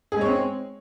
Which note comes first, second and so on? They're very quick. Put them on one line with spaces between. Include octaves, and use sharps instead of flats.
G#4 G#3 C#5 C4